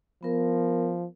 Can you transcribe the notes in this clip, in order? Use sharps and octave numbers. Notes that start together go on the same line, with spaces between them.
F3 B3 A#4